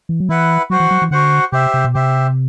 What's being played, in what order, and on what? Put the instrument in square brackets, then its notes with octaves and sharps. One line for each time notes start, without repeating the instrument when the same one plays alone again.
[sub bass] E3
F#3
[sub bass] E3 [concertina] E4 B4 F#5
[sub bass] F#3 [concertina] F#4 C5 F#5
[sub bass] E3
F#3
E3
[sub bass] D3 [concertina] F#4 C5 F#5
[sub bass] C3 [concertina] G4 C5 E5
[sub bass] C3
B2
[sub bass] C3 [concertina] G4 C5 E5